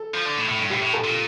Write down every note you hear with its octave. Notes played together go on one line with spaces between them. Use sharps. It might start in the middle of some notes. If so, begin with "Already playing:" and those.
Already playing: A4
F3
D3
A2
A2
G2
A2 G4
A2
A4
A#2